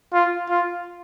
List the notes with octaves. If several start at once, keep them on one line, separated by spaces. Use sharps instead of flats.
F4
F4